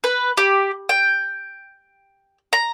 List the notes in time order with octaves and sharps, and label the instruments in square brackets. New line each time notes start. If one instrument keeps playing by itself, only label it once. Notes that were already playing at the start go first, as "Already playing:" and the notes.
[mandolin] B4
G4
G5
A#5